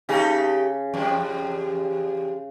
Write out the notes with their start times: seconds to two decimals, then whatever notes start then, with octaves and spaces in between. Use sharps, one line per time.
0.09 C#3 A3 D#4 G4
0.94 E2 G3